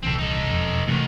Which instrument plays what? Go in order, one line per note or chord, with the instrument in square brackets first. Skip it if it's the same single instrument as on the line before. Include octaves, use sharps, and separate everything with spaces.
[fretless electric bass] D#1 C2 E3 [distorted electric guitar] C4 A4
[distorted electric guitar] D#4 A4
[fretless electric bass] E1 F2
[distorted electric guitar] G#2 D#3 [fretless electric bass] C3 E3 A3